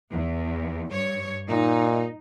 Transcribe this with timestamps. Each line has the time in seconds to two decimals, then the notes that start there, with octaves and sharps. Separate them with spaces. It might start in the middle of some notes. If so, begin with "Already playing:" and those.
0.11 E2
0.91 G2 C#5
1.49 A#2 D#4